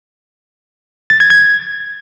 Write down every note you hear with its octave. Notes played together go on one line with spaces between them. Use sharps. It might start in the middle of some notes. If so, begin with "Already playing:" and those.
A6
G#6
G#6